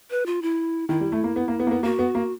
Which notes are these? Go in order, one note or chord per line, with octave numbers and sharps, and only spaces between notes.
B4
F4
E4
D#3 E4
G3
A3
A#3
B3
A#3
B3
A#3
B3
A#3 F#4
B3
A#3